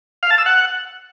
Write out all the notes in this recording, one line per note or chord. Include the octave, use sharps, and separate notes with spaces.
F5
A5
E6
F#5